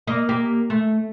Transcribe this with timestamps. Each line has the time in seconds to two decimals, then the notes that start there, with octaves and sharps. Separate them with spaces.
0.07 A#3 D#5
0.29 A#3 G4
0.70 A3